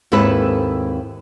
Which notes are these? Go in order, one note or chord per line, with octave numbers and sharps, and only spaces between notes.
D#2 G#2 C4 E4 A4 B4